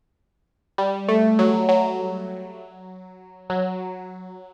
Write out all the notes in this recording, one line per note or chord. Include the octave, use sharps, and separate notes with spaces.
G3
A3
F#3
F#3
F#3